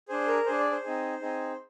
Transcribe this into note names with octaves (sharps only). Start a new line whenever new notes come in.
D4 G#4 C5
A#4
D4 G#4 C5
D5
C5
C4 D#4 G#4
C4 D#4 G#4